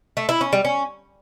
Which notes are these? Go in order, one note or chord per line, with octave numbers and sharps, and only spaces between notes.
A3
E4
C#4
G3
C#4